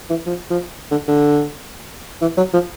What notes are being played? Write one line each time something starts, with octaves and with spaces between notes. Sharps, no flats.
E3
F3
F3
D3
D3
E3
F#3
F3